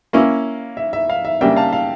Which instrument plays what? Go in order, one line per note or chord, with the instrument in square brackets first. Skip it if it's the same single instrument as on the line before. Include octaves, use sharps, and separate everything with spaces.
[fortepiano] A#3 C#4 E4 [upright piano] F5
[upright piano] E5
E5
F5
E5
[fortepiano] C#3 G3 A#3 D4 [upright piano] E5 G5
[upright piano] F5 A5
F5